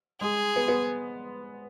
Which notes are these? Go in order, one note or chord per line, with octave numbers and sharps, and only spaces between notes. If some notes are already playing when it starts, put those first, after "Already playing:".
G#3 G#4
B3
B3